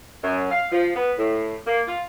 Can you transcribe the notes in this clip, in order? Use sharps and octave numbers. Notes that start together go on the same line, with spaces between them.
F#2
F5
F3
B3
A2
A#3
F4